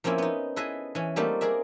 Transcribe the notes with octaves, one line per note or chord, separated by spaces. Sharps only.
F3 A#3 C4 C#4 E4
B3 D#4
E4 G#4 A4 B4 D#5 E5
E3 C#4
G3 A3 A#3 C4 D#4 F4
G#4 A#4 D5 E5